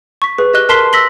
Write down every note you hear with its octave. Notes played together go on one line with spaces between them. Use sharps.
C#6 B6
G#4 B4
G4 D#5 F#6 G7
A#4 A5 C6 B6 C7 G7
E6 A#6 B6 F#7 G7